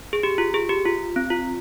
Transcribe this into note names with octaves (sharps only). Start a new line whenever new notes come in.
G#4
G4
F4
G#4
G4
F4
C4
F4